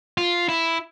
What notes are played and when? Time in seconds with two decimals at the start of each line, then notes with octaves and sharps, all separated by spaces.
0.18 F4
0.49 E4